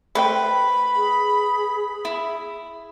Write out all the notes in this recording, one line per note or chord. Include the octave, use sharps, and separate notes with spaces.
A3 B4 C5 G5 B5
G#4
E4